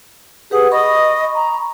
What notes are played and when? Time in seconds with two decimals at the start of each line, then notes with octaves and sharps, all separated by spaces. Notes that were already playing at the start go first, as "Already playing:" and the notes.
0.51 G4 G#4 B4 F#5
0.72 D#5 B5 C#6
1.35 A#5